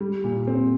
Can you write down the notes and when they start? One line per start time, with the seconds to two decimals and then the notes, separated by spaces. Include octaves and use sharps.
0.01 G3
0.24 A#2
0.47 C4